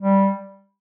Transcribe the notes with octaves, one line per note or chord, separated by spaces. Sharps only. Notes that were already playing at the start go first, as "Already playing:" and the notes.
G3